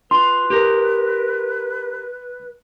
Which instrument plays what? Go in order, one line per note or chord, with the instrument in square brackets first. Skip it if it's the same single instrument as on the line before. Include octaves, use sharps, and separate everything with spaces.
[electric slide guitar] F4 [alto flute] B4 [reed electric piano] C6
[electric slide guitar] G4 A#4